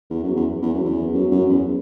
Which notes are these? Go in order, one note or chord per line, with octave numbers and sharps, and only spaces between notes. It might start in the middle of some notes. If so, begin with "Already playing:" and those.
E2
F#2
E2
E2
F#2
E2
F#2
F#2
E2